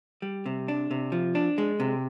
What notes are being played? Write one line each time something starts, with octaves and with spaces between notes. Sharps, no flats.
G3
C3
D4
C3
F3
D4
G#3
C3